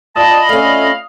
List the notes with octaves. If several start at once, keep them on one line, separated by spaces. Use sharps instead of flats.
F4 D5 D#5 A5 B5 D#6
A3 C#4 F5